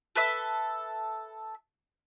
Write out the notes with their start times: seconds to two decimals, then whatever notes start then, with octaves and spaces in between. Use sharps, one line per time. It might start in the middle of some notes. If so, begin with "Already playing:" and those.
0.16 A4 B4 E5 E6